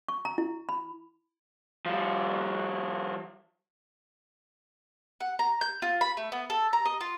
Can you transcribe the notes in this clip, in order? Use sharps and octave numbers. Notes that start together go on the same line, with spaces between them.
C#6
A#5
E4
B5
F3 G3
F#5
A#5
G6
F4
B5
A3
B3
A4
A#5
D#5
F4